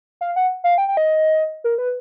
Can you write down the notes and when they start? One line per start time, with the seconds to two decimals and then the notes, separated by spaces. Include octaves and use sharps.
0.21 F5
0.36 F#5
0.64 F5
0.78 G5
0.88 G5
0.97 D#5
1.64 A#4
1.78 B4